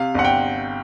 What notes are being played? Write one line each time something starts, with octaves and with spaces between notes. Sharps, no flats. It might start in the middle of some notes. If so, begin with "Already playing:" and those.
Already playing: C3 F5
G1 F#5
G5